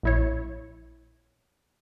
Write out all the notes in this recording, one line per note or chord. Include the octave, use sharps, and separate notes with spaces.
A#1 E4 C#5